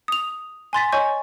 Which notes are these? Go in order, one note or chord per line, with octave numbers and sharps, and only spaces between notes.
D#6 F7
G#5 C6 A6 B6
C#5 D#5 G#5 C#6 G6